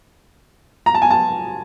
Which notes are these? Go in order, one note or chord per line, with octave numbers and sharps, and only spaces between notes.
A#5
A5
G#5
A5